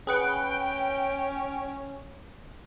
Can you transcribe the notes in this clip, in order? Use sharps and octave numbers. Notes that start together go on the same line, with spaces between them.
C#4 G#4 B4 F#5 G5